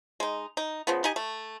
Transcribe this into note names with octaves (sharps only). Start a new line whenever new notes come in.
G#3 D#4
D#4
C#3 F3 B3
D#4 G4 D#5 G#5
A3